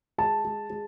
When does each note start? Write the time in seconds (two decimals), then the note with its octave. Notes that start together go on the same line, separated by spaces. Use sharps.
0.18 G#3 A5
0.45 G#3
0.70 G#3